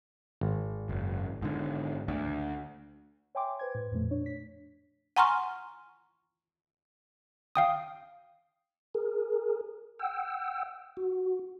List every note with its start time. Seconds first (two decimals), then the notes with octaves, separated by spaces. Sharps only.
0.41 G#1
0.89 F#1
1.42 G#2 D3
2.08 D2
3.35 C#5 E5 G5 G#5 C6 D6
3.59 B4 C5 G#6
3.75 A2
3.92 F2 A#2 F3 A3
4.11 D4 C#5
4.26 B6
5.16 F#5 G#5 A#5 C6 C#6 F6
7.56 F5 G5 D#6
8.94 G#4 A#4
9.99 F#5 G5 E6
10.97 F#4